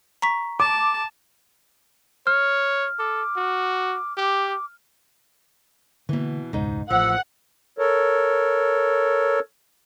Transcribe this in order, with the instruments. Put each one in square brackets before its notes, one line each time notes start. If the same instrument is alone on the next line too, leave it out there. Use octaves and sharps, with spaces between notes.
[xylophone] A#5 C#6 B6
[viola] A5 [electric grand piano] D6
[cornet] C#5 [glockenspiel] F6
[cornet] A4 [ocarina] D6
[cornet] F#4
[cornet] G4 [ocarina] D6
[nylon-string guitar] B2 E3 [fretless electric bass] D3 A#3
[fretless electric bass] E1 C#2 [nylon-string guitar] G#2 D#4
[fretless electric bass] A1 [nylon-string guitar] F3 [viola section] F#5 [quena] E6
[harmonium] A4 A#4 C#5